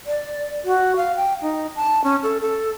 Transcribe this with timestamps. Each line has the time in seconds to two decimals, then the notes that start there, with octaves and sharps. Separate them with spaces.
0.06 D5
0.65 F#4
0.96 F5
1.16 G5
1.42 D#4
1.76 A5
2.04 C#4
2.23 A4
2.41 A4